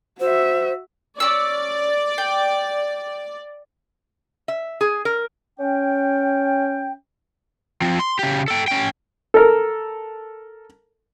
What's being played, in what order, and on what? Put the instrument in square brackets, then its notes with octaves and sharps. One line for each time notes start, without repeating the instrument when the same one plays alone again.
[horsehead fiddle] F#4 E5 [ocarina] C5
[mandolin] C#4 E6 [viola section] D5
[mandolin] G5
[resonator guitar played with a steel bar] E5
G#4
A#4
[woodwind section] C#4 G5
[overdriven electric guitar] F3 C4
C6
C#3 G4
A4 G5
C#4 G5
[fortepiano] A4 A#4